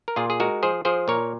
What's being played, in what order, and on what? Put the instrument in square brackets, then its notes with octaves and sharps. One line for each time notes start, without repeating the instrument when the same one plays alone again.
[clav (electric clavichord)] A#4
A#2 F4 G#4
G#4
G#3 F#4 A#4
F3 G#4 C5
F3 G#4 C5
A#2 A#4 C#5